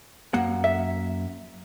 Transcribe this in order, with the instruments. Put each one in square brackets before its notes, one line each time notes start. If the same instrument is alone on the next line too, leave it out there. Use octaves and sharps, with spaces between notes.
[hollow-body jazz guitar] F#2 A#3 F#5
[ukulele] E5